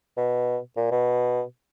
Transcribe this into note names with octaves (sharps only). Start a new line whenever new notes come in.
B2
A#2
B2